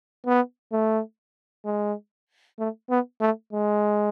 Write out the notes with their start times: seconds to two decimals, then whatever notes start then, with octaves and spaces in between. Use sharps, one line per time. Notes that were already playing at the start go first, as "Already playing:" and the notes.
0.26 B3
0.72 A3
1.65 G#3
2.59 A3
2.90 B3
3.21 A3
3.53 G#3